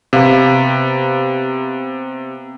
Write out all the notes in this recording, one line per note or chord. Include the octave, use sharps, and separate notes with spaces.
C3 B3 F5